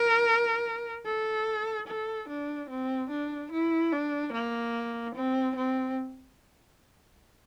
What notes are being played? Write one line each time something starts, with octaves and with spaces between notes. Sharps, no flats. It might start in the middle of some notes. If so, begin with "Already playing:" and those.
Already playing: A#4
A4
A4
D4
C4
D4
E4
D4
A#3
C4
C4